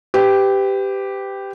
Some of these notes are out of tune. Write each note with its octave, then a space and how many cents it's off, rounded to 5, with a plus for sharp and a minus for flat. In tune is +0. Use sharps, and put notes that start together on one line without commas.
G4 +0 B4 +35